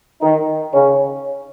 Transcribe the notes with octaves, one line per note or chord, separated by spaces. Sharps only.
D#3 D#4
C#3 C#4